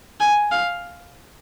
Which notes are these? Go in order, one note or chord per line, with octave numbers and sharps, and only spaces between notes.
G#5
F5